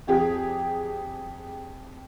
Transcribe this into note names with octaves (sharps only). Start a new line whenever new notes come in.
F2 G4 G#4